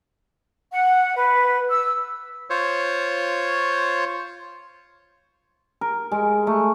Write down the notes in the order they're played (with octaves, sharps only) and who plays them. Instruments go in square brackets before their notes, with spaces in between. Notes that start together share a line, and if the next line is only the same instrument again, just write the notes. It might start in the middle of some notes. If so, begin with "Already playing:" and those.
[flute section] F#5
B4
E6
[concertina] F4 C5 C#5
[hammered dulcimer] A#4
G#3
A3